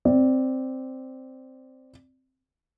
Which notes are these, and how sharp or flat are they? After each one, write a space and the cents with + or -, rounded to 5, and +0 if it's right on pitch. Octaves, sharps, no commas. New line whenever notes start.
C4 +0 D5 +0